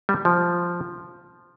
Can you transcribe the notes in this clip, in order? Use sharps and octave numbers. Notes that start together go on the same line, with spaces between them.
G3
F3